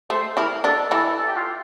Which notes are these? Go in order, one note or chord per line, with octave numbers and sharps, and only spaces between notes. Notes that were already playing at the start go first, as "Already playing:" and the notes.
A3 C5
E3 E4 A#4
D3 D4 A4
E3 E4 A4
A4
G4
F4